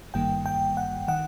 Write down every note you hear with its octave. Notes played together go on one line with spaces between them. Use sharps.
G#1 G2 D#3 G3 A#3 G5
G5
F#5
D#3 F#5